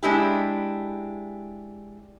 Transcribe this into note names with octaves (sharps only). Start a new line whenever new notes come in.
G#3 D4 E4 G4